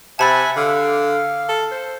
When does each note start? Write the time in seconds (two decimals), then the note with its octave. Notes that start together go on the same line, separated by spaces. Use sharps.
0.19 C3 E5 F#5 G#5 A5 B5 A6
0.56 D3 F5
1.48 A4
1.71 C5